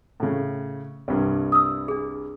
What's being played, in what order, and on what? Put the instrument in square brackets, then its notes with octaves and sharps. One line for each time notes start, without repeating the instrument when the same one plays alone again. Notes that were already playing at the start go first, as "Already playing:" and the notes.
[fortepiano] A2 C#3
C2 G2
[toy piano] D#6 E6
D4 G#4